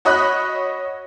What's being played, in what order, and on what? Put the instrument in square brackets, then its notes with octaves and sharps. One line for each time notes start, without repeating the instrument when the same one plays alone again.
[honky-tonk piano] F#4 C#5 D#5 B5 D#6 F#6